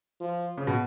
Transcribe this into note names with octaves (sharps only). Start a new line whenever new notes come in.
F3
C#3
B2